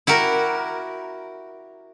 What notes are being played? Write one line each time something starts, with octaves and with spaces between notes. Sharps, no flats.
E4 F#4 G4 A#4